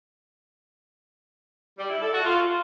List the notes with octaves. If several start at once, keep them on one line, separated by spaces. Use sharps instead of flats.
G3
E4
A4
F#4
F4